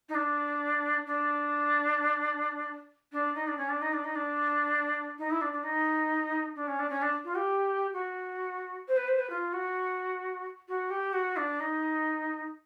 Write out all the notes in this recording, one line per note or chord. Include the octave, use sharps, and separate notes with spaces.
D#4
D4
D4
D4
D#4
D4
C#4
D4
D#4
D4
D#4
D4
D#4
E4
D4
D4
D#4
D4
C#4
D4
C#4
D4
F4
G4
F#4
C5
B4
C5
B4
F4
F#4
F#4
G4
F#4
D4
D#4